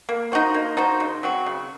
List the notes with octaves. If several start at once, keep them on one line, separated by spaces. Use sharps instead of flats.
A#3
D#4 F#4 C5
A#3
D#4 F#4 C5
C#3
F#3 C4 F#4
C#3